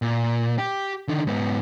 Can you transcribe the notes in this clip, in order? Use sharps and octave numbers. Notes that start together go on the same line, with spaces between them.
A#2
G4
D3 D#3
G#2 B3